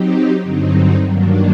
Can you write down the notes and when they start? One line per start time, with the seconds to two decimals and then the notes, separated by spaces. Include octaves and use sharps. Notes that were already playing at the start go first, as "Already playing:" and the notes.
Already playing: F#3 C4 D#4 G4
0.42 G2 D3 F#3 C4 D#4
1.08 G2 D#3 F#3 A#3 D4